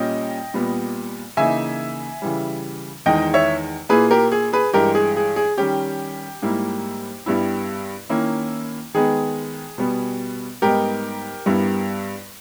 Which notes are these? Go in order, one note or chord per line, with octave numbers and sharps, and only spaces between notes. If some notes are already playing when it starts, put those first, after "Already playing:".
Already playing: A#2 G3 C#4 D#5 G5
A#2 G3 B3
C#3 E3 A#3 D#4 E5 G#5
C#3 E3 G3
E2 D#3 G#3 D#4 D#5 G5
C#5 E5
A#2 A#3 E4 G#4 B4
G4 A#4
G#4
G#4 B4
G2 E3 G#3 G4 A#4
G#4
G#4
G#4
D#3 G3 C#4 G4
G#2 G3 A#3 E4
G2 G3 B3 E4
D#3 A#3 C#4 E4
D#3 G#3 B3 G#4
B2 G3 B3
G#2 G3 B3 D#4 G4 A#4
G2 G3 B3 E4